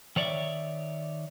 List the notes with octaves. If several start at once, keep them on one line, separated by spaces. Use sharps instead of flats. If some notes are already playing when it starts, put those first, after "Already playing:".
D#3 C#5 D5 E5